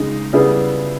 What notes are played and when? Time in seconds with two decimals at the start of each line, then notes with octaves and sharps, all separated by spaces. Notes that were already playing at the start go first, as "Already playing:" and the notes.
Already playing: C#3 G#3 D#4
0.33 C#3 G3 B3 E4 G#4